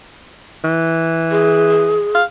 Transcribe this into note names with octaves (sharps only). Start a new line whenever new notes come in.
E3
G#4
F5